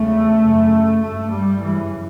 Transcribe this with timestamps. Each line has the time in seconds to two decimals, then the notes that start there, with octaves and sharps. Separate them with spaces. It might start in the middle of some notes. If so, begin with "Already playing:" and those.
Already playing: E2 C#3 A3
0.39 F#2 C#3
1.00 G2 A3
1.30 G3
1.60 F#2 C#3 E3